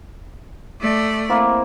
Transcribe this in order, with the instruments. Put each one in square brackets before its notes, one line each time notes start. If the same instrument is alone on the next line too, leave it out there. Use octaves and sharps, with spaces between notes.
[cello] A3 D5
[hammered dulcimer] A#3 C4 E4